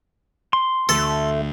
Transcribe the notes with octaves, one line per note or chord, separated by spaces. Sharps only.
C6
D2 A3 A4